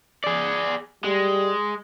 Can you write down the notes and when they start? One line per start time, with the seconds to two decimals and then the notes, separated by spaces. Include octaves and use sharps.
0.24 G#4 D5
1.04 G3 G#3